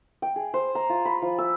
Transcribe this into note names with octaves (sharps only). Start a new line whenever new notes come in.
G5
G#4
C5
A#5
F4
B5
F3
E6